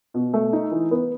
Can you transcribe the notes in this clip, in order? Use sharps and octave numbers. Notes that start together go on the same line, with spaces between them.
B2
A3
D#4
E3
B3